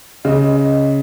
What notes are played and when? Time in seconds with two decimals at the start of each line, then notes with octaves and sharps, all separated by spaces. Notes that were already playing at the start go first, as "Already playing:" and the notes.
0.25 C#3 D#5
0.55 D#5